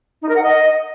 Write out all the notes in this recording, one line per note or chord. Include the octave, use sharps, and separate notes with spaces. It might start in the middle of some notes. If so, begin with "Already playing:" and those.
D#4
A#4
F#5
D#5